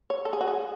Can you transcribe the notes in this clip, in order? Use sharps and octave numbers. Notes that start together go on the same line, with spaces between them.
C#5
A4
G#4
F#4
G#4